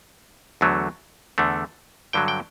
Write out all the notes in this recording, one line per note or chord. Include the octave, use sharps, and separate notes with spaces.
E2 D3 F#3 A3
E2 D3 A3
G2 D3 F#3 G5
G5